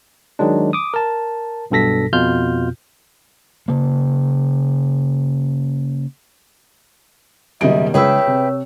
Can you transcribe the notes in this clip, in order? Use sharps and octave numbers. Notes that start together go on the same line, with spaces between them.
D#3 F#3 G#3 D4
D6 D#6
A#4 A5
B1 G2 B2 A4 A#6 B6
F2 B2 F4 F6 G6
C#3 A#3
F#1 B2 D#3 G3 D#5 E5 D7
C#2 G#4 B4 C#5 E5 G5 E6
C3